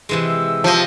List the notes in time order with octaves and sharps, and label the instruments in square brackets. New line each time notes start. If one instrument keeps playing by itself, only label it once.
[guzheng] C3 E3 G#3
[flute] E6
[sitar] F3 [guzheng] G4 D#5